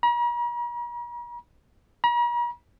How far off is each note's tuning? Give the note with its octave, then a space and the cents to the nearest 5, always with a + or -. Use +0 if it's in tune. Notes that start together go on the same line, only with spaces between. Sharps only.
A#5 +45
A#5 +45